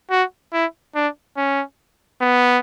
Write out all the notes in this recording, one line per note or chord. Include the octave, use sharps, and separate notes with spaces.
F#4
E4
D4
C#4
B3